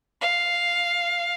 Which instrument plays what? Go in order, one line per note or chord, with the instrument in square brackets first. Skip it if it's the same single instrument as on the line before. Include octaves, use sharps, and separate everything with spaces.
[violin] F5